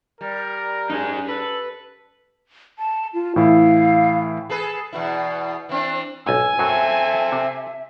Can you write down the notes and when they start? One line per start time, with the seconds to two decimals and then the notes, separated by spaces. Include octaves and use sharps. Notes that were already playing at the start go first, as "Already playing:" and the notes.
0.21 G3 A#4
0.90 F#2 D#4 G#4
1.29 A4 B4
2.79 A5
3.14 F4
3.36 A2 E3 E4 F5
4.49 G#4 A4 B4
4.93 E2 B2 E4
5.69 E3 C4 D4
6.27 B1 G#2 G#5 E6
6.59 F#2 F#3 C4 A4 E5
7.32 C3